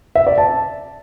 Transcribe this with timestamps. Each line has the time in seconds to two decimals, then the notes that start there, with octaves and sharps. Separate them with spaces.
0.15 E5
0.27 D5
0.38 A5